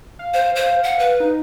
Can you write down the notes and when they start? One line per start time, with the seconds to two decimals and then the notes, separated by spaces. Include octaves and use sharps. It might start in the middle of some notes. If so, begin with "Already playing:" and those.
0.19 F5
0.34 C5 F5
0.56 C5
0.84 F#5
0.99 B4
1.20 D#4